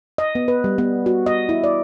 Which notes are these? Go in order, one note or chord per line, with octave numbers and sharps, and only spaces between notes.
D#5
B3
B4
G3
B3
F#4
D#5
E4
D5